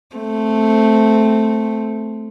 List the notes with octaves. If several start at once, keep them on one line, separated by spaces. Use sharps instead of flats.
A3 C4